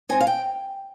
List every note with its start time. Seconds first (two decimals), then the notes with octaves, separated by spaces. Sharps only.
0.09 G#3 C4 D#4 G#5
0.21 F5
0.27 G5